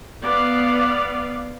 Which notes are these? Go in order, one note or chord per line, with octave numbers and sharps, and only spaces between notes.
B3 D5 F5